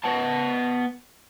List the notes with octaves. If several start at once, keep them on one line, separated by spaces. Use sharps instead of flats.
B3 A5